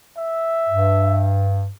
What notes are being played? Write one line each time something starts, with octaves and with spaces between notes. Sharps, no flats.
E5
G2